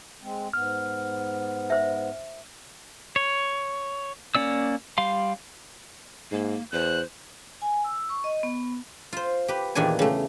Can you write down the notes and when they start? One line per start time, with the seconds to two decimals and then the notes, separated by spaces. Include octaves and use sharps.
0.22 G#3 C4
0.53 G#2 B3 F6
1.70 C5 E5
3.16 C#5
4.35 A#3 C#4 D5 E6
4.98 G3 F5 C6
6.31 G#2 A#3
6.72 E2 C5 F#6
7.62 G#5
7.84 E6
8.09 C#6
8.24 D#5
8.43 B3
9.13 F4 C5
9.48 G4 B4
9.75 E2 A#2 D#3 D4 G4 G#5
9.99 C#3 A3